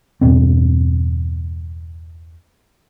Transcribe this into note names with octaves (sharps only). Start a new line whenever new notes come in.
E2 G2 B2 C4